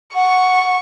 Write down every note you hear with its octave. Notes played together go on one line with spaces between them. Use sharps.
F#5 C#6